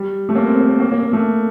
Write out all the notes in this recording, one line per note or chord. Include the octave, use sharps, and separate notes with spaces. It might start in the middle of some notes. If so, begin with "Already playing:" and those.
Already playing: G3
A3
A#3
C4
A#3
A#3
A#3
A#3
A#3
A3